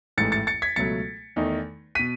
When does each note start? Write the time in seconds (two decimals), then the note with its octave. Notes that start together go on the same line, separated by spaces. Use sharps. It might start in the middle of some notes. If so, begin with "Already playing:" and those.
0.17 A1 G#2 E3 A3 E4 A6 C#7
0.32 A6 C#7
0.47 A6 C#7
0.62 G#6 B6
0.76 C#2 B2 F#3 A3 A6 C#7
1.36 E2 D#3 A3 D#4
1.95 B2 B6 D#7